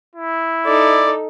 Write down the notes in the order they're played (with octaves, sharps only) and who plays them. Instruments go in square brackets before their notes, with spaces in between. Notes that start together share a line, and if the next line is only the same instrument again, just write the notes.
[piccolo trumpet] E4
[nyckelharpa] D#4 A4 [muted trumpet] D5